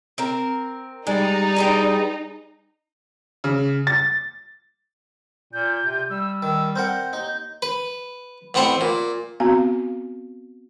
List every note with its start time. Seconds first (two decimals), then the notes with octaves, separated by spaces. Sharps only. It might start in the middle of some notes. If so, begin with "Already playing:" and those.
0.18 C4 A#4
1.07 G3 G#3 D#4 D5
1.56 G#4 B4 G5
3.44 C#3
3.87 A6
5.53 A#2 G6
5.85 C3
6.10 G3 E6
6.42 D#3 E6
6.76 C4 A#4 F#5 G6
7.13 D#2 D#4
7.62 B4
8.54 A1 B3 C4 F#5 B5
8.81 A#2
9.40 B3 C4 F#4 F5 A#5